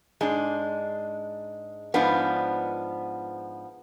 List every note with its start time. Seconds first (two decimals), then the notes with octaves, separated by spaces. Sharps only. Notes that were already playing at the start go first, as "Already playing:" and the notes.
0.21 G#2 G#3 D4
1.94 G#2 F3 B3 D4